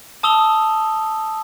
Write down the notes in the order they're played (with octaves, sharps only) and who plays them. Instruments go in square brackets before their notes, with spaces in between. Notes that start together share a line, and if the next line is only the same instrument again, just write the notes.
[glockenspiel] A5 D#6 E6 F7 G7